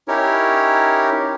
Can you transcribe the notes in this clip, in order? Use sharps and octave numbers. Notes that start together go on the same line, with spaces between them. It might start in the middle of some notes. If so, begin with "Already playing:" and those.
C#4 D#4 E4 G4 A#4 C#5